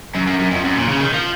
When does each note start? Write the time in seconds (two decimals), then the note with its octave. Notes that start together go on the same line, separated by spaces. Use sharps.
0.15 F#2
0.27 F#2
0.40 F#2
0.51 F2
0.65 F#2
0.76 A#2
0.89 C#3
1.00 D#3
1.13 F3